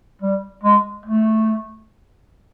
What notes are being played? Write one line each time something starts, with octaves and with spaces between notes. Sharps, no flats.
G3
G#3
A3